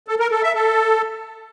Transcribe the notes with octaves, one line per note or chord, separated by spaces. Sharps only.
A4
A#4
A4
E5
A4